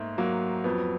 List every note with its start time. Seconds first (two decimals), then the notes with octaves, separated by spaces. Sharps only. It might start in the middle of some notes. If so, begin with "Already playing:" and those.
Already playing: G#2 A3 A#3
0.18 F#3 A#3
0.64 F2 B3